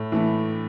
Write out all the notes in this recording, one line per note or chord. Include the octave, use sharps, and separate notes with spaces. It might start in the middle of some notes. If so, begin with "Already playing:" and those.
Already playing: A2
E3 A3